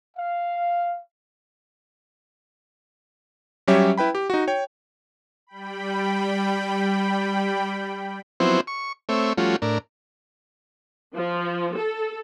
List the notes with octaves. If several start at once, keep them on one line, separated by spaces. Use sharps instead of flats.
F5
F#3 G3 C#4 G4 C#5 E5
E4 B4 G5 B5
G4
D#4 F#4
C#5 G5
G3 G5 B5
F3 F#3 B3 C4 E4 C5
C#6
A3 C4 C#5 E5
F3 G3 A3 C#4 F4 F#4
A2 D4 A#4
F3
A4